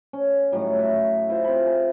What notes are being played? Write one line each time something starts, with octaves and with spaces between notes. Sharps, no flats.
C#4
A2 D#3 F#3 G3
F#4 E5
E4 F4 C5
C4 B5
G#4